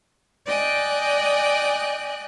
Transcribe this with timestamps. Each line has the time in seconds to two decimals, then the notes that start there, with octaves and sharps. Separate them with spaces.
0.45 D5 D#5 G5 G#5 F#6